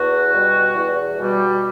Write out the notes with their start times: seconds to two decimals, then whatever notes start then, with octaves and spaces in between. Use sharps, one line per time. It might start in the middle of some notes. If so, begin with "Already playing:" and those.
Already playing: E2 F#4
0.32 B2 G3
0.75 E2
1.18 B2 G3